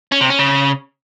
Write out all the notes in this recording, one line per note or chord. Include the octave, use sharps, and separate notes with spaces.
C#4
C3
C#4
C#3